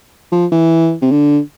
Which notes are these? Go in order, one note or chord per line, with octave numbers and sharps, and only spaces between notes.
F3
E3
C3
D3